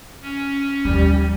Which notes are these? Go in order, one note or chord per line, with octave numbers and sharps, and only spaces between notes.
C#4
D#2 F3 G3